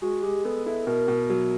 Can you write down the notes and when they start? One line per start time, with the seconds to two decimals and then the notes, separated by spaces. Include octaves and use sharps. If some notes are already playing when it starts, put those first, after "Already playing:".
0.02 G#3 F#4
0.23 G#3 G4
0.44 B3 A4
0.66 E4 A4
0.86 B2 A#4
1.08 B2
1.29 F#3